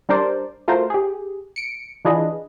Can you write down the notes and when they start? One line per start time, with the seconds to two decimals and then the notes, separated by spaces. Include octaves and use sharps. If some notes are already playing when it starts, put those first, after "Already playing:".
0.09 G3 D4 A#4 C5 D5
0.68 A3 F4 F#4 A#4 C5
0.90 G4 G#4
1.56 C#7 D7
2.05 E3 D4 F4 G#4 B4 D#5